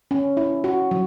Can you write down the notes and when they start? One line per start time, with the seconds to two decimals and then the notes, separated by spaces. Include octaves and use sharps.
0.11 C#4
0.37 E4
0.64 F#4
0.91 F#3